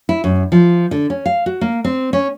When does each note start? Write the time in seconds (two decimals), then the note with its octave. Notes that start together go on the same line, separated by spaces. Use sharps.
0.09 E4
0.24 F#2
0.52 F3
0.91 D3
1.10 C#4
1.26 F5
1.46 F#4
1.61 A#3
1.84 C4
2.13 C#4